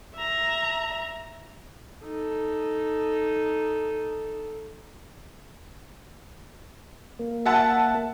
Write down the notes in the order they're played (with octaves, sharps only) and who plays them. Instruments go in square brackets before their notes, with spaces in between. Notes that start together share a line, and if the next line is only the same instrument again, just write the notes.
[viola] E5 A#5
[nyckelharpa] D#4 A4
[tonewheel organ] A#3
[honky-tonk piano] E5 F#5 A5